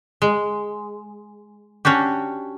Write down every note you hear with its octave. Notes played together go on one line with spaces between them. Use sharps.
G#3
C#4 D4 F#4 G4